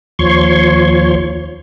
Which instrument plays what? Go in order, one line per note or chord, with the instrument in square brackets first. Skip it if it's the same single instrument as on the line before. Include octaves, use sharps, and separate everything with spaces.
[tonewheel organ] D#2 F3 C#5 C6 C#6